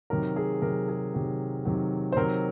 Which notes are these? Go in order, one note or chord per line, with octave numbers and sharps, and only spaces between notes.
C3 D#3 F#3 A#4
G#4
C3 D#3 F#3 A#4
G#4
C3 D#3 F#3
C3 D#3 F#3
C5
C3 D#3 F#3 A#4